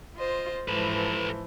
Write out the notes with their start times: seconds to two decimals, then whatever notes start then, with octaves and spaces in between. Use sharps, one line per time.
0.15 F4 C5 D#5
0.68 G#2 E3 F3 A4 B4